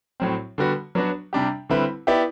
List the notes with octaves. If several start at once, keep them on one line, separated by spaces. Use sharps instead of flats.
A2 F#3 C4
D3 G3 B3 F#4
F#3 B3 D4 F#4
C3 G3 D4 G4
D3 G3 C4 E4 B4
B3 E4 G4 D5